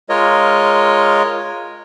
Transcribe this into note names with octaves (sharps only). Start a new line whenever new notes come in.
G#3 F4 A#4 C#5 D#5